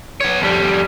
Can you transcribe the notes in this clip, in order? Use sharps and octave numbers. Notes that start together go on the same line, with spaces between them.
B3 C#5
F2 G3